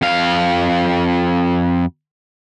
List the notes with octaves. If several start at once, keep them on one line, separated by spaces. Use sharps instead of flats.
F2 F5